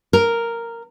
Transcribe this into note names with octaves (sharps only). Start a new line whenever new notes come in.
A#4